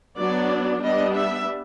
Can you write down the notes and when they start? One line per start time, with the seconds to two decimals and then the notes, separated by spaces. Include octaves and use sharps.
0.17 F#3 B3 D4 D5
0.82 G3 B3 D4 D#5
1.15 E5